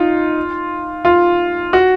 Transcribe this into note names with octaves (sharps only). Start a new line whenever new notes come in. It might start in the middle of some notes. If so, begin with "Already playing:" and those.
Already playing: D#4 F4
F4
F#4